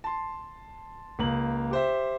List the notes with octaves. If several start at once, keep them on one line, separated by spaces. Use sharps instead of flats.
A5 C6
C#2 A#3 F#7
G4 C5 E5